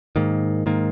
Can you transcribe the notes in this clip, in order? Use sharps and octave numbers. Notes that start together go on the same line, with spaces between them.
G#2 D#3 A#3
G#2 D#3 A#3